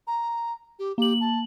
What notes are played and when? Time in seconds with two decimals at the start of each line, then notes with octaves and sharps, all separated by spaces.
0.07 A#5
0.79 G4
0.98 A#3 G4 F#7
1.20 A5